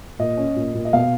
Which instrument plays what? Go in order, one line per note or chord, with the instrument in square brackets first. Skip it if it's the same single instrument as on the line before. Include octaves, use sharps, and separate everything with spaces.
[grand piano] A#2 D#5
C#4
A#2
A#2
D#5
B2 F5